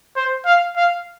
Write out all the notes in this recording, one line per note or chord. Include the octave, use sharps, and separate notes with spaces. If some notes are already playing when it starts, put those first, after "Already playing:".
C5
F5
F5